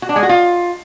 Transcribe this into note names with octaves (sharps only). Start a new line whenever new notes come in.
F#4
D4
G#3
F#4
F4